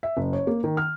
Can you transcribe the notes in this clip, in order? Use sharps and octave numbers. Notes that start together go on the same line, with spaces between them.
E5
F#1
C#5
A#3
D#3
F6